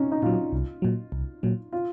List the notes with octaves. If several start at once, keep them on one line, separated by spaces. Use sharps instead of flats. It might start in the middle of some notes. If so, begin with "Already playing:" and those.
Already playing: C#4 D#4 F4
D#4
A#2 F#3 F4
C2
A#2 F#3
C2
A#2 F#3
F4